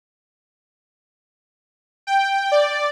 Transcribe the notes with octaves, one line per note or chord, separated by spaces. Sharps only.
G5
D5